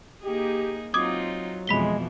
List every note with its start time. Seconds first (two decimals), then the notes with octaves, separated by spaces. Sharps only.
0.23 A#3 D#4 G4 G#4
0.94 F#3 C4 D#4 F4 D6 D#6 G#6
1.67 F2 B2 E3 G#3 B5 B6 G7